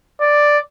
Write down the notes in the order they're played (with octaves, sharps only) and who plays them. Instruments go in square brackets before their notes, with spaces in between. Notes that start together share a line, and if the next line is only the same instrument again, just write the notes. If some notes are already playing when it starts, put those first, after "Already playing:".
[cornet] D5